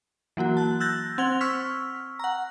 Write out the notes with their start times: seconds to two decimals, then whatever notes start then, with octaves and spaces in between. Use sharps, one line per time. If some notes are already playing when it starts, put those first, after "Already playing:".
0.37 E3 F#3 A#3 F#4
0.57 A5 F#6
0.80 E6 F#6 G6 A6 A#6
1.18 C4 F#5 G#6 F7 G7
1.41 C#6 E6 F6 B6
2.19 F#5 A#5